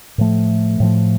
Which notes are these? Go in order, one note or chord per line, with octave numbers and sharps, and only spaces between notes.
A2 F3 A3
A2 F3 A3